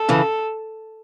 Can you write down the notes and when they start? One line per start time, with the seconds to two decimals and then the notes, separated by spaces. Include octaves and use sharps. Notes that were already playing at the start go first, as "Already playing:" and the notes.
Already playing: A4
0.09 C#3 E3